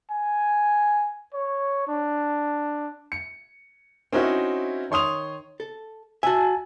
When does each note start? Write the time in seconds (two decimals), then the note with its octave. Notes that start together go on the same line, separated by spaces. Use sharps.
0.11 G#5
1.34 C#5
1.88 D4
3.12 C#7
4.12 C4 C#4 D#4 E4 F#4
4.91 D#3 C#5 C6 D#6 F7
5.60 A4
6.23 F#4 E5 G#5 A5